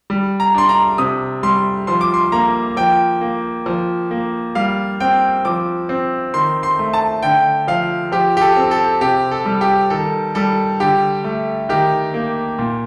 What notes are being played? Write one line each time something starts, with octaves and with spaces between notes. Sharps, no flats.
G3
A#5
D4 C6
A#5
C3 D#6
G3 C6
F3 C6
D6
C6
A#3 A#5
F3 G5
A#3
F3
A#3
G3 F5
C4 G5
F3 D6
C4
D#3 C6
C6
A3
A5
D3 G5
F3 F5
F3 G4
G4
A4
C4
A4
C3 G4
A4
G3
G4
D#3 A4
G3 A4
D3 G4
A3
D#3 G4
A#3
A#2